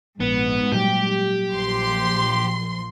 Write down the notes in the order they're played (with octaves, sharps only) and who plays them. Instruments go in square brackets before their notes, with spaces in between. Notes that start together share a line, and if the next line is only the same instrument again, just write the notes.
[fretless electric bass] A#1 [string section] G#2 [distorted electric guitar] B3
[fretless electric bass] A#2 F#3 G3 [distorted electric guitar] G4
[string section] A#1 F3 C6